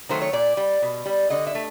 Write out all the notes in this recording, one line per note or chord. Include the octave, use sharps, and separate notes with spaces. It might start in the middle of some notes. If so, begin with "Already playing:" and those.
D#3 F#3 A3 C5
C#5
A#2 D5
G3
B2
G3
D3 D#5
E5
A3